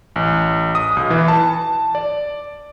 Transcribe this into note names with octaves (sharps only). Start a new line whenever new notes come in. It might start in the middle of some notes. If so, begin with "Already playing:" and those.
A1
D#6
B1
E3
A5
D5